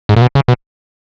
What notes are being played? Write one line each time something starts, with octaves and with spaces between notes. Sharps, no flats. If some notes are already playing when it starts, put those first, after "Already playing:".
G#2
A#2
B2
C#3
B2